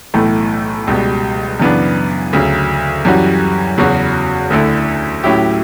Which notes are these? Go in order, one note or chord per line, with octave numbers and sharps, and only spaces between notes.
B1 A2 E3 A3
C#2 B2 G3
F#2 C#3 E3 B3 D4
D2 C#3 F#3
F#2 E3 G3 C#4 F#4
E2 C#3 F#3 C#4 F#4
D2 D3 A3 E4
A2 F#3 C#4 E4 G4